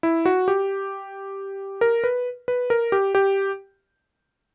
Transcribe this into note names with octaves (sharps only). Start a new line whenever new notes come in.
E4
F#4
G4
A#4
B4
B4
A#4
G4
G4